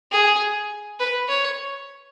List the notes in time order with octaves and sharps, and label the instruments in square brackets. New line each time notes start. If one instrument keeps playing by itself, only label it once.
[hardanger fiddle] G#4
B4
C#5